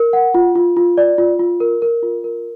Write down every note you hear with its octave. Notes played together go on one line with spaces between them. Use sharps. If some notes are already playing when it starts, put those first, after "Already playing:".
Already playing: A#4
F#5
F4
F4
F4
D5
F4
F4
A#4
A#4
F4
A#4